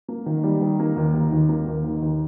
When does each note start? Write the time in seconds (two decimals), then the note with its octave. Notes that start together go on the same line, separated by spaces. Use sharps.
0.08 A#3
0.26 D#3
0.43 G3
0.61 D#3
0.80 A#3
0.96 D#2
1.14 D#3
1.32 D#2
1.49 A#3
1.67 D#2
1.84 D#3
2.02 D#2